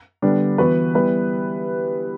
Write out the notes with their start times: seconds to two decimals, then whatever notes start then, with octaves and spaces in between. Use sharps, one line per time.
0.22 D3 G3 B3 D4
0.58 E3 B3 F#4 B4
0.94 G3 B3 E4 B4